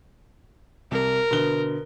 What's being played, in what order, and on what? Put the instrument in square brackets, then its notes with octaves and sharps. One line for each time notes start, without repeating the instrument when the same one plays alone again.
[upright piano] C2 [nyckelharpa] A#4
[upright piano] B2 D3 G7